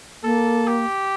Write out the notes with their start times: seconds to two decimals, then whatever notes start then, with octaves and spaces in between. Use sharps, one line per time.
0.24 A#3 A4
0.67 G4